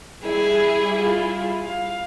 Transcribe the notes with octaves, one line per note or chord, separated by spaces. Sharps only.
G3 E4 G#4
F4 G#4
F5